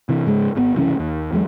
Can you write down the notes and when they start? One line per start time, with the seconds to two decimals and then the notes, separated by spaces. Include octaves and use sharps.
0.09 C3 E3
0.26 G#2 C#3 G#3
0.55 G#1 C3 B3
0.75 F#1 C2 E3 C#4
0.99 D#2
1.32 E2 F#3 G#3